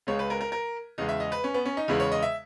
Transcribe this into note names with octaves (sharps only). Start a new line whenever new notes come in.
C#2 C#3 G#3 C#5
B4
A#4
A#4
A#4
E2 C#3 G#3 D#5
E5
D#5
B4
C#4
B3
C#4
D#4
E2 C#3 G#3 E4
C#5
D#5
E5